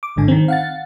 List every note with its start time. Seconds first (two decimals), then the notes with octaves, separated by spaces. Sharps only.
0.03 D6
0.16 G#1 G#2 D3 G#5
0.28 D#3 C4
0.48 F5 F#5 A6